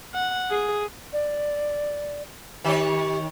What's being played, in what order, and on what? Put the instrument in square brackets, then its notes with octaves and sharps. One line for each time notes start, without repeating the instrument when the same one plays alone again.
[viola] F#5
G#4
[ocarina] D5
[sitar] D#3 C#5 [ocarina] G4